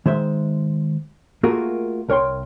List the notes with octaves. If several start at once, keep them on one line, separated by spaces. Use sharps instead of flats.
D#3 G#3 C5 E5
A3 A#3 F4 F#4 G#4 A#4
C2 A#4 C#5 G5 C6